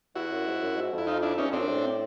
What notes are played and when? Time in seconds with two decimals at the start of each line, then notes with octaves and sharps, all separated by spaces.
0.15 E2 E4 F#4
0.31 F#2
0.47 G#2
0.61 F#2
0.76 G#2
0.93 F2
0.98 E4
1.07 D#4 F4
1.22 D4 E4
1.38 E2 C#4 D#4
1.49 F2 C4 D4
1.59 F#2
1.69 A2